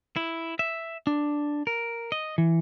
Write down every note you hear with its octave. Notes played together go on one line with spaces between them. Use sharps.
E4
E5
D4
A#4
D#5
E3